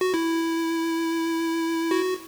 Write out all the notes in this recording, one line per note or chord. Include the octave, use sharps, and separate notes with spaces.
F#4
E4
F#4